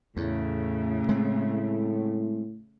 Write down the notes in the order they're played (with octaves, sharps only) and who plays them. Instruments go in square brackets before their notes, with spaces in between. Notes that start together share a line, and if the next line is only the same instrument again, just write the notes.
[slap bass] E2 [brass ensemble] A2 [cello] C#3 A3
[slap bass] G#3 C4